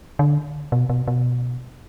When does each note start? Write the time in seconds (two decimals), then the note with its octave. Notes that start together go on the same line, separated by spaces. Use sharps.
0.19 D3
0.72 B2
0.89 B2
1.08 B2